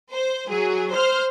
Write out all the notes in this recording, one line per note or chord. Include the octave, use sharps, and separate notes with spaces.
C5
F#3 G#4
C5 F6